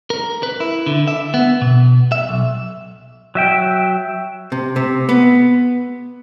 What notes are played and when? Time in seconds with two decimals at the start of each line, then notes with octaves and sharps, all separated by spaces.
0.10 A#4
0.43 B4
0.60 E4
0.86 D3
1.08 E5
1.34 B3
1.62 B2
2.12 E5
2.29 B1
3.35 F#3 E5 G5
4.52 C3
4.76 C3
5.09 B3